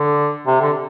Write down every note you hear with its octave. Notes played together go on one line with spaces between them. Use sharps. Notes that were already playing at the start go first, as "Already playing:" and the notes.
Already playing: D3
C3
D3